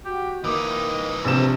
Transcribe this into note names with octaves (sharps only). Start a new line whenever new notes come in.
F#4 G4
E3 A#3 D#4 D#5 D6
A#1 C3 E7